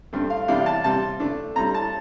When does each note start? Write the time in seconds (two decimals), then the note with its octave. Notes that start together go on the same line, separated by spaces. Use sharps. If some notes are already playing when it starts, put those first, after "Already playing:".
0.13 G2 D3 A3 C4
0.30 F5
0.48 E2 C3 G3 D4 F5
0.66 A5
0.84 C3 G3 C4 A5
1.20 D3 A3 D4
1.56 D3 G3 C4 A#5
1.74 A5